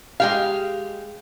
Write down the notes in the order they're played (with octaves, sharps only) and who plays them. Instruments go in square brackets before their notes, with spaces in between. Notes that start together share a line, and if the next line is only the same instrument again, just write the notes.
[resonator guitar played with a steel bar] G#3 G4 F5